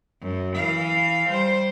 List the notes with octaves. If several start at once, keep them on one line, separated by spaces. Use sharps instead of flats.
F#2
E3 F5
G3 C5